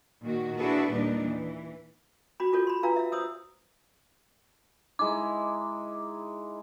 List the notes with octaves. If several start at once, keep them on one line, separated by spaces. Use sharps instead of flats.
A#2 D#3 F#4
D4 E4 F#4 G#4 A4 B4
D#2 A#2 G3 D4 D#4
E3
F#4 B5
F4 F#4 A4 C#5
B5 C6
D4 F4 B4 F5 A#5
E5 F5
C5 C#5 D#6 E6
G#3 D#4 E4 D6